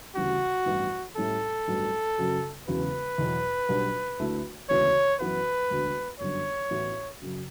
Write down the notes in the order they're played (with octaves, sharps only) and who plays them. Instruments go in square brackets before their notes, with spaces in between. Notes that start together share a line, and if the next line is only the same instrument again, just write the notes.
[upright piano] D2 C#3 E3 G3 [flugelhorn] F#4
[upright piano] A1 G2 E3 B3
[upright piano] A2 G3 C#4 E4 [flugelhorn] A4
[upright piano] A1 G2 F#3
F#2 C#3 F#3
[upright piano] E1 E2 C#3 F#3 [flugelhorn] B4
[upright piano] E2 B2 F#3
B1 B2 G3 B3 D4
D2 D3 A3 E4
[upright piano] E1 D2 C#3 E3 [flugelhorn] C#5
[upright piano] F#2 E3 B3 F#4 [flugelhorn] B4
[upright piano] E1 D2 D3
[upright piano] G1 F#2 D3 [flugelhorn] C#5
[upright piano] A1 A2 E3 B3 F#4
F#2 C#3 F#3